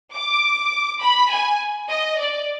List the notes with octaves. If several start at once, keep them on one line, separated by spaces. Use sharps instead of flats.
D6
B5
G#5
D#5
D5